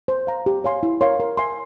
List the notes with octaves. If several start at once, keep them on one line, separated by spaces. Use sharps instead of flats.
C5
F5 A#5
G4
C#5 F5 G#5 C6
E4
A#4 C#5 F5 C6
A#4
E5 G#5 C6